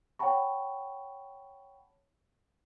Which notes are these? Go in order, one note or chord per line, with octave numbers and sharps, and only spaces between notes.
C#5 F#5 G5 A5 B5 C#6